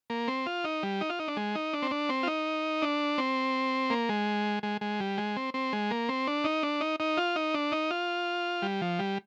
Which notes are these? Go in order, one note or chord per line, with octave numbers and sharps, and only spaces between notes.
A#3
C4
F4
D#4
G3
D#4
F4
D#4
D4
G#3
D#4
D4
C4
D4
C4
F4
D#4
D4
C4
A#3
G#3
G#3
G#3
G3
G#3
C4
C4
G#3
A#3
C4
D4
D#4
D4
D#4
D#4
F4
D#4
D4
D#4
F4
G3
F3
G3